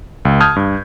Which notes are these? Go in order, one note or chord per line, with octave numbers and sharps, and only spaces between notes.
C#2
A5 D#6 F6 G6 G#6
G2